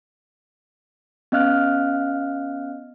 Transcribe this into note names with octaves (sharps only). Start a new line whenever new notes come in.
B3 C#4 D#5 F5 F6 F#6